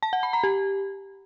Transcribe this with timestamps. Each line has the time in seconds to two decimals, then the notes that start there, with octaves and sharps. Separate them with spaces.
0.03 A5
0.13 F#5
0.23 B5
0.33 A#5
0.43 G4